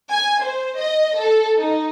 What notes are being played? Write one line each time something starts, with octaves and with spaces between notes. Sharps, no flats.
G#5
C5
D#5
A4
D#4